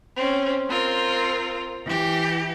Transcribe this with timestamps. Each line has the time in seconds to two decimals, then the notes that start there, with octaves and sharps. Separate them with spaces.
0.15 C4 C#4
0.68 C4 F4 A#4
1.85 E3 G4